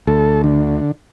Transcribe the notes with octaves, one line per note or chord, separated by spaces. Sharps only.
D2 A4
D3